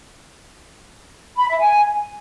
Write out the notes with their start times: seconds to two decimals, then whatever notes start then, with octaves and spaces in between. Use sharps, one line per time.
1.38 B5
1.49 E5
1.60 G#5